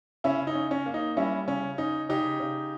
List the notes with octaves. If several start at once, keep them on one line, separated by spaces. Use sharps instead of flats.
C#3 C#4 E4
D#4
C#4
C#4
A#3
D#4
G3 C#4 E4
C#3 C#4
C#4 D#4
C#3 D#4 G4
C#3